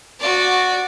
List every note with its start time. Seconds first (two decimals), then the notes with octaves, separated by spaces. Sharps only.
0.20 F#4 D5